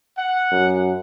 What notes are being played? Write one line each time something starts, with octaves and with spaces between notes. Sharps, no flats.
F#5
F#2